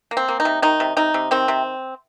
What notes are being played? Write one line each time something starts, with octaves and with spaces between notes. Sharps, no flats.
A#3
C4
A#3
D#4
C3
D#3 D#4
C3
C3 D#4
C3
D#3 C4
C3